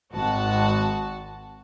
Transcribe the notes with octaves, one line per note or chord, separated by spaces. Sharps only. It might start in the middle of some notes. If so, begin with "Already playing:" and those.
G#1 F#4 A5